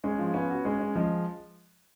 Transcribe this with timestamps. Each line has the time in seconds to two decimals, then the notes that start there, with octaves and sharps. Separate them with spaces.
0.04 G#3 C#4
0.18 F3
0.34 B3 C#4
0.50 F#4
0.65 G#3 C#4
0.80 C#4
0.96 F3 G#3